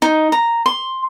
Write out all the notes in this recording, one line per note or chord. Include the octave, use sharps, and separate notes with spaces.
D#4
A#5
C6